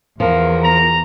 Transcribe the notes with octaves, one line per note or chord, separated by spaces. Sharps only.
E2 F3 A#4
A#5